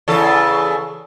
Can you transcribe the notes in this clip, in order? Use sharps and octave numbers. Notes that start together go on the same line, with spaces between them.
E2 C#3 A4